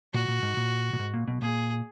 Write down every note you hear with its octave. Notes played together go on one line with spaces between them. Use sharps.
A#2 F#4
A#2
G#2
A#2
A#2
G#2
A#2
B1 B2
A#2 G#4